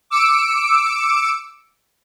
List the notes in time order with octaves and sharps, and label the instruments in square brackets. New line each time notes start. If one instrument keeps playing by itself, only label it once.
[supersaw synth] D6 E6 C#7 D7